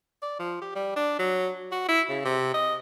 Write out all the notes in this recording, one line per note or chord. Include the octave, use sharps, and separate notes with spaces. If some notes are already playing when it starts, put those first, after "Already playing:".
D5
F3
G4
G3
D4
F#3
F#4
E4
C#3
C3
D#5